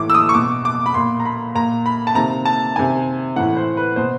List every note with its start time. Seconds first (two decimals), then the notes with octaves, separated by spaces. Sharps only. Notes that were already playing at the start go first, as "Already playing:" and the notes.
Already playing: A2 E3 D6
0.10 E6
0.14 D#6
0.29 C#6
0.34 B2 D6
0.65 D6
0.86 B5
0.94 A#2 C6
1.20 A#5
1.25 B5
1.55 A#2 A#5
1.86 B5
2.07 A5
2.15 C3 D#3 A#5
2.45 A5
2.76 C3 D#3 G#5
3.36 A2 E3 F#5
3.57 C5
3.77 B4
3.96 B2 C5